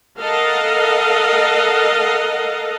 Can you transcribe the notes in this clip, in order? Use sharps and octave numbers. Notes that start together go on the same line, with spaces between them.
A4 A#4 D#5 F5 F#5